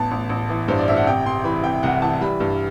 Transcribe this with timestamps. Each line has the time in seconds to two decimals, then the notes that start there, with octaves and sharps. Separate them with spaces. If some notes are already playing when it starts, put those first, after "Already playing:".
Already playing: A1 B3 A5
0.11 A1
0.29 A1
0.49 E3
0.68 G2 C5
0.78 D5
0.88 A1 E5
0.96 F#5
1.07 C3 G5
1.26 C3 C6
1.44 E3 B5
1.63 C3 G5
1.83 C2 F#5
2.02 E3 A5
2.21 G3 B5
2.40 G2